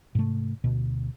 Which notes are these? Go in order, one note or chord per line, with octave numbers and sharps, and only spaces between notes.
G#2 C3 A3
D2 B2